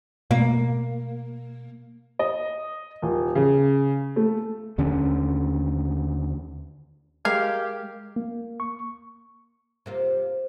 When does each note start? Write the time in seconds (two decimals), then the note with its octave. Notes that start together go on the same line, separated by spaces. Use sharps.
0.31 B2 A#3
2.19 D#5
3.02 D#1
3.35 C#3
4.16 A3
4.78 D#2 D3 C#4
7.25 G#3 G4 A#4 F5 G#6
8.16 A#3
8.60 C#6
9.86 C3 A#3 F4